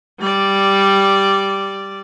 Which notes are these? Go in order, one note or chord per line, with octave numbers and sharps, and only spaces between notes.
G3 D5